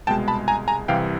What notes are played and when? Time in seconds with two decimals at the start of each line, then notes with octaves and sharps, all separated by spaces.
0.07 C2 B2 G#3 G5 A5
0.28 A5 B5
0.48 G#5 A#5
0.68 G#5 A#5
0.88 C2 C3 E3 F5 G5